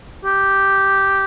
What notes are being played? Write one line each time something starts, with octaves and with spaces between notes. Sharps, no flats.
G4